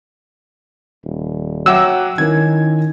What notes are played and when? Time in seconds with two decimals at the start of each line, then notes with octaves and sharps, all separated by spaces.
1.05 D#1
1.66 F#3 E5 F#5 G5 D6 E6 F#6
2.18 D#3 C#4 E4 A#4 G#6